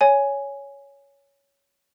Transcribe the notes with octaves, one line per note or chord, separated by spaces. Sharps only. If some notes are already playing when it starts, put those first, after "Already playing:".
C#5 G#5